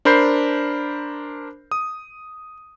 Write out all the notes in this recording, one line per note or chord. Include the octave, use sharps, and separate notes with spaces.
D4 A#4 C5 B5 G6 C7
D#6